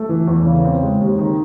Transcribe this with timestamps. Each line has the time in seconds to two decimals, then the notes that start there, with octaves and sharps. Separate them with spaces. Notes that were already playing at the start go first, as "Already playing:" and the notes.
Already playing: A3
0.09 E3
0.28 E2
0.45 C#3
0.65 C4
0.83 G#3
1.01 D#2
1.19 D#3